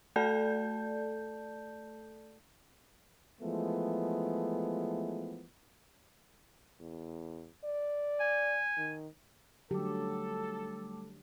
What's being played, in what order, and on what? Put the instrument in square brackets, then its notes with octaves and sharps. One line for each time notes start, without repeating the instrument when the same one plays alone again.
[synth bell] A3 A4 D5 A5 G6
[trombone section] E3 F3 G#3 A3 B3
[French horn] E2
D5
[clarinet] G#5
[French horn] D#3
[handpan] D3 F#3 G4 [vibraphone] G3 A3 D6 [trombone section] A4